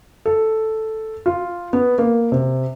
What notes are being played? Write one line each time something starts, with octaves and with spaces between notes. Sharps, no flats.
A4
F4
B3
A#3
C3